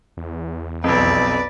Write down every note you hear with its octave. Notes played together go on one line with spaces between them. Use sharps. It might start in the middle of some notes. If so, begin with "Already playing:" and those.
E2
B1 F2 B4 D5